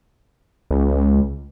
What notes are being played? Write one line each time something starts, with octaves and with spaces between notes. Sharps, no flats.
C#2